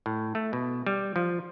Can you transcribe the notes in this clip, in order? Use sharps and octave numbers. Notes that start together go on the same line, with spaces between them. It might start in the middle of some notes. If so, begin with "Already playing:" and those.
A2
A3
B2
G3
F3